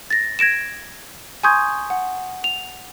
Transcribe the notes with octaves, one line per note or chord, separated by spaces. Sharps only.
A6 A#6
G#6 A#6 D7 E7
G#5 C6 C#6 D#6 G6 G#6
F#5
F7